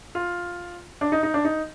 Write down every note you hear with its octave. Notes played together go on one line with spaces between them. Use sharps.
F4
D4
D#4
D#4
D4
D#4